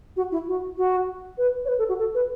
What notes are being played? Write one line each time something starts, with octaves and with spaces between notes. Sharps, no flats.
F#4
E4
F#4
F#4
B4
C#5
B4
A4
F#4
A4
B4